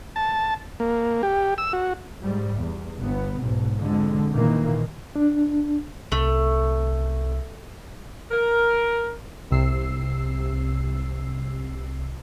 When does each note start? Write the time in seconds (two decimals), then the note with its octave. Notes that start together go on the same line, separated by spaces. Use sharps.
0.16 A5
0.80 A#3
1.23 G4
1.58 E6
1.73 F#4
2.22 G#2 G3
2.58 E2
2.97 G1 B3
3.40 B1 G#2 B2
3.77 F2 D3 G#3
4.31 A#2 D#3 E3 A#3
5.16 D4
6.12 C2 A3
8.31 A#4
9.51 C2 C3 E6 C7